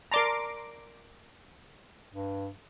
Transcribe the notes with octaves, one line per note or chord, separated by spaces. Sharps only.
A#4 D5 A5 A#5 C6 D6
G2